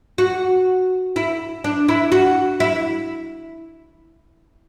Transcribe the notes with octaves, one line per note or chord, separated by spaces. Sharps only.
F#4
E4
D4
E4
F#4
E4